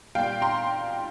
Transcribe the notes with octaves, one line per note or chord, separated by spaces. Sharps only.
A#2 G3 F5 G5
A#5 C6